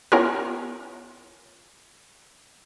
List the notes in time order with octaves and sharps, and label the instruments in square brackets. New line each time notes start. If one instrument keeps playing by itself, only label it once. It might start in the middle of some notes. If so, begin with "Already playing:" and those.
[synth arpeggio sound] B3 C#4 E4 F4 G4 A#4